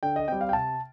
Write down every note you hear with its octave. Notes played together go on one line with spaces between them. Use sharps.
D3 G5
D#5
G3 C4 G5
F5
G5
C3 A5